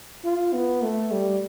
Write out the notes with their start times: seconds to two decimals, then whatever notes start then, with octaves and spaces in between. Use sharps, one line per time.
0.25 F4
0.54 B3
0.83 A3
1.12 G3